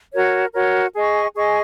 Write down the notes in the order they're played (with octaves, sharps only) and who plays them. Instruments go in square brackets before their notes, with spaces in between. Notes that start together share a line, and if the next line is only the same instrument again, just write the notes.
[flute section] F#4 A#4 C#5
F#4 A#4 C#5
G#4 D#5 G#5 C#6
G#4 D#5 G#5 C#6